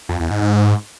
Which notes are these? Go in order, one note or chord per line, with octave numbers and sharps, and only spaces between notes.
F2
E2
G#2
G#2